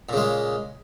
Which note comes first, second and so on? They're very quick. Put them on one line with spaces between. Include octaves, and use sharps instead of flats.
A#2 C#3 G#3